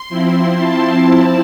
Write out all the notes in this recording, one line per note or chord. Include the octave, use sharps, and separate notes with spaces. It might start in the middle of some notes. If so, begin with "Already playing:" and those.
Already playing: C6
F3 C4 E4
A5
F3 C4 E4